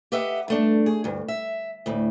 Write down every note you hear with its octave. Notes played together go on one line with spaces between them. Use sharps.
G4 B4 D#5 E5 F#5
G2 A3 D4
G#4
D2 G2
E5
D2 A2